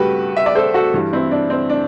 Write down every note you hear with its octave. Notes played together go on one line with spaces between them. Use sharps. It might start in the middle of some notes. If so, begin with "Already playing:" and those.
Already playing: G2 A3 F#4 G4 B4
E5
D5
A4 C5
F#4 A4
G2 E3 G3
C4 E4
D4
C4
D4